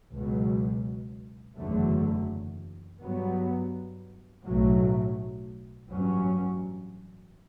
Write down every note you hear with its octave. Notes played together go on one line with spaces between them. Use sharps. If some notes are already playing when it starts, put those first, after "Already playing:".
C#2 B2 F#3
F#1 E2 D3 F#3 A3
G2 F#3 B3
B1 A2 F#3 A3
A1 G2 F#3 C#4